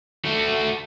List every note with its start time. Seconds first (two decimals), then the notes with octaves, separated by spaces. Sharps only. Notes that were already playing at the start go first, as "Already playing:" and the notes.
0.25 A3 F#4